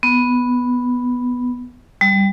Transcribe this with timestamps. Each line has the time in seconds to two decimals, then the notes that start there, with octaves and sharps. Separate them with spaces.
0.03 B3
2.01 G3